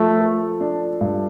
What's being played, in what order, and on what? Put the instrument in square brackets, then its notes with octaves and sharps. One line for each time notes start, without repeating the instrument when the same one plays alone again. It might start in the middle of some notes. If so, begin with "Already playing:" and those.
Already playing: [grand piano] F3 [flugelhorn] A3
[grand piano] A4
D4
G2